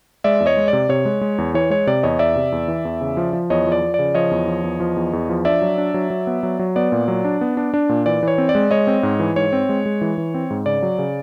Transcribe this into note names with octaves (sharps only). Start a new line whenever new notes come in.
G#3 D5 E5
E2
C#5 D#5
G#3
C3 D5
C3 C#5
G#3
G#3
E2
E3 C#5
G#3 C#5
C3 D5
E2 C#5 D#5
E2 D5 E5
C3
E2
E3
E2
C#3
F3
F3
E2 C#5 D#5
F3
D5
F3
C#3 D5
F3 C#5 D#5
E2
F3
E2
F3
E2
E2
F3
D4 D5 E5
F#3
D4
F#3
F#3
B3
F#3
F#3
B3 D5
A#2
F#3
D4
B3
D4
D4
A#2
E3 D5
E3
C#5
C4
D5
G#3
G#3 C#5 D#5
C4
G#2
E3
G#2 C#5
C4
G#3
G#3
E3
E3
C4
G#2
C#3 D5
F#3
C#3